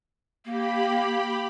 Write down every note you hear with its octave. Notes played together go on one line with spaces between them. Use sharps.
A#3 G4 B5